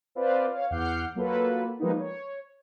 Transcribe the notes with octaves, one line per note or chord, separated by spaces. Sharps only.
C4 F4 B4 D5
C#5 F5
E2 F#5 D6 F6 G6 C7
F#3 A#3 F4 A4 B4
F3 G3 G#3 A#3 B3 D#4
C#5